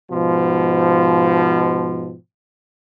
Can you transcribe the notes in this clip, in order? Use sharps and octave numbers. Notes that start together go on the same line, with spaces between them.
G#2 B2 F3